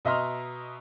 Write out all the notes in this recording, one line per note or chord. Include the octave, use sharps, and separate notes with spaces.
B2 D#5 E5 A#5 C6 F6